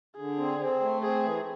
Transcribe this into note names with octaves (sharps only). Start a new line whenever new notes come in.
D3 G#4
C4
C4
A3
C4 G#4
E3